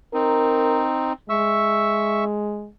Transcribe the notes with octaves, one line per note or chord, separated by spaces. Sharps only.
C4 D#4 A#4
G#3 E5 C#6 E6